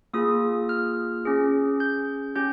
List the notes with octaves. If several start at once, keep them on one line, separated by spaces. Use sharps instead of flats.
A#3 F4 G#4 D#6
F6
C#4 G#4
G6
C#4 G4 G6